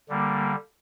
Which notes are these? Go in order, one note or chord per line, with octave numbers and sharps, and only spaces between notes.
D3 G3 A#3